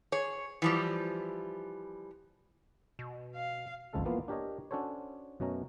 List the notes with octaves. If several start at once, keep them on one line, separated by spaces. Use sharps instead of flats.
G#4 C#5
E3 F3 G3
B2
F5
G#1 C#2 F3 G#3 A4 F5
E3 F3 A#3 B3 F4
D4 G4 A#4 C#5 D#5
C#4 D4 F#4 A4 C5 C#5
F#2 B2 A3 C#4 A#5